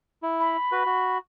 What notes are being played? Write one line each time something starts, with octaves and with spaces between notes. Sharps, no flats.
E4
B5
F#4 B4
F#4